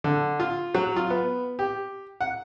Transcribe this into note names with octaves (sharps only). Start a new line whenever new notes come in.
D3
F4
F#3
F4
B3
G4
F#5